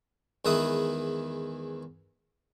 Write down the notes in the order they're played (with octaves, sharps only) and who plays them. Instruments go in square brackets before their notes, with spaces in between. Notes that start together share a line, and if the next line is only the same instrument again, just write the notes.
[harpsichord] E2 D#3 G#3 B4 E5 D#6